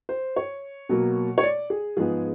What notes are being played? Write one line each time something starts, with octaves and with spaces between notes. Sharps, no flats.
C5
C#5
B2 F#3 A#3
C#5
D5
G#4
G#2 F3 G#3 B3 G#4